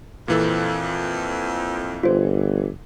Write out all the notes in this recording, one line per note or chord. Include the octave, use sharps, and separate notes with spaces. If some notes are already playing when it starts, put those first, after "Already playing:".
F2 A#2 E3 A4
G1 F4 C5